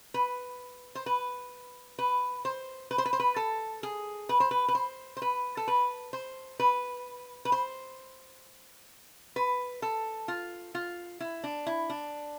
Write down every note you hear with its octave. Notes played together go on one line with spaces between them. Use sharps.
B4
C5
B4
B4
C5
B4
C5
B4
C5
B4
A4
G#4
B4
C5
B4
B4
C5
C5
B4
A4
B4
C5
B4
B4
C5
B4
A4
F4
F4
E4
D4
E4
D4